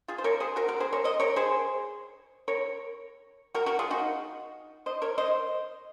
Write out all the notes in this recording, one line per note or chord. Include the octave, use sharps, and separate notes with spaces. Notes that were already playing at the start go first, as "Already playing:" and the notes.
F4 G#4
C5
A#4 C#5
G#4 C5
F#4 A#4
F#4 A#4
G#4 C5
A#4 C#5
C5 D#5
A#4 C#5
G#4 C5
A#4 C#5
F#4 A#4
F#4 A#4
F4 G#4
D#4 F#4
C5 D#5
A#4 C#5
C5 D#5